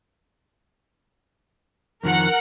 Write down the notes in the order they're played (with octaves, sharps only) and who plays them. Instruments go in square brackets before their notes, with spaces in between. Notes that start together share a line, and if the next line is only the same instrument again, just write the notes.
[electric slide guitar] F2 D#3 F3 [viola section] A#4 F#5